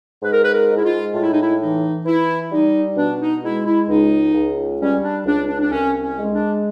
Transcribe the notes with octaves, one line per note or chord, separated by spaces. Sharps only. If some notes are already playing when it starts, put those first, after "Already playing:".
G#2 B4
A#4
B4
A#4
G#3
E4
F4
A2 F4
E4
D#4
E4
E3 D#4
E3 E4
G3 D#4
B2 D4
D#4
G#3 E4
E4
C#2 D#4
C#2
G3 C#4
D4
C#2 D4
D4
D4
C2 C#4
C#4
G#3
D4